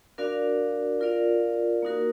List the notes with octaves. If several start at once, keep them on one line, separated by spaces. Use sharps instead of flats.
D4 F#4 A#4 D5 F5
F4 A#4 D5 F5
A#3 D#4 F#4 A#4